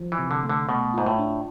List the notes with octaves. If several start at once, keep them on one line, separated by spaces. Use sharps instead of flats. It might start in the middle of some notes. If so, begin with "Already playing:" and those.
Already playing: F3
E3
C3
D3
A3
D3
B2 A3
G#2 F4
A2
D4